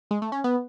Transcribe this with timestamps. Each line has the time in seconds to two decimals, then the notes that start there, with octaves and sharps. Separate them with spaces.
0.11 G#3
0.22 A3
0.32 C#4
0.44 B3